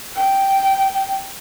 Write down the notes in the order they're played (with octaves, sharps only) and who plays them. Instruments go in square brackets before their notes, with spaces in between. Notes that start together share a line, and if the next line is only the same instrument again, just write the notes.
[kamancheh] G5